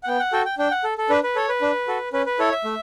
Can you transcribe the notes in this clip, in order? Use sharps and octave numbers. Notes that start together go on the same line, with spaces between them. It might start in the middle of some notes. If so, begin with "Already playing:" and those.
F#5
B3 G5
F#5
F#4 A4 G5
G5
D4 G5
F#5
A4
A4
D4 B4
B4
A4 C#5
B4
D4
F#4 A4
C#4 B4
B4
E4 A4 C#5
E5
A3